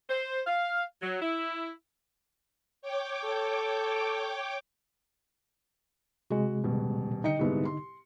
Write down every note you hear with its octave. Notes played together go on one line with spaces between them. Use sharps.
C5
F5
F#3
E4
C#5 G5 D6
A4
C3 G#3 F#4
D#1 B2
D3 D#4 D#5 G5 C#7
C2 G#2 B3
C6